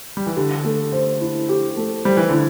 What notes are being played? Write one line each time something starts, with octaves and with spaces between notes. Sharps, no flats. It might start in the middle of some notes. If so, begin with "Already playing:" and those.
G3
E3
D3 G4
A3
C5
E4
G4
A3
G3 C5
E3
D3 E4